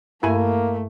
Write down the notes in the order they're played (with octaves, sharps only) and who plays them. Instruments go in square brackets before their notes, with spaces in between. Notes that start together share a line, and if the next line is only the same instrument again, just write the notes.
[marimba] G2 [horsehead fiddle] A3 [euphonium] A#3 [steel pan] E4 G#5